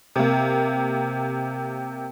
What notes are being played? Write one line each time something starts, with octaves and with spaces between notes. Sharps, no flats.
C3 A#3